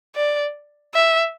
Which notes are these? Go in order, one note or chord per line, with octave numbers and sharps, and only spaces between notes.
D5
E5